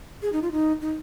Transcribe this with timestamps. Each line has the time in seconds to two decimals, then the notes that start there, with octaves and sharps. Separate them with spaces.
0.22 G#4
0.33 D#4
0.42 F4
0.52 D#4
0.82 D#4